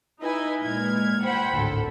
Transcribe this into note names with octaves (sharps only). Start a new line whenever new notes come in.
D#4 E4 B4 D#5 G#5
A#2 G#3 F6 G#6
C5 F#5 G5 B5
G#1 D2 A2 A4